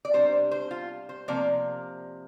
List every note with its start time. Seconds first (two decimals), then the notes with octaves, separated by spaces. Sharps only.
0.05 D5
0.13 C3 G3 D4 C5
0.51 C5
0.71 F4
1.09 C5
1.28 C3 F3 A#3 D5